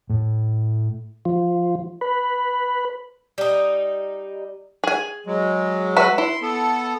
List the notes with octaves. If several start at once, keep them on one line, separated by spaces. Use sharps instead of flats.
A2
F3
B4
G3 D#4
G#4 G#5
F#3 G#3
F#4 B4 E5
E4 C6
B3 A4